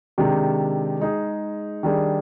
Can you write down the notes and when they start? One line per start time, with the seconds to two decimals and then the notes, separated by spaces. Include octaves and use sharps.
0.18 C3 D#3 G#3 D4
1.00 G#3 D#4 G#4
1.83 D#3 G3 D4 G#4